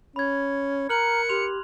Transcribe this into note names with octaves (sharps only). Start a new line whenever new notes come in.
C#4 B5 G#6
A#4 A#5 F6 F#6 C#7 F#7
G4 C6 F7